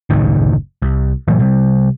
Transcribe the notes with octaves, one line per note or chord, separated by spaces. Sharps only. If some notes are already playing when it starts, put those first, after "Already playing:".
F#1 C#2 A2 D#3
C2
A#2 E3 F#3 A3
C3 G3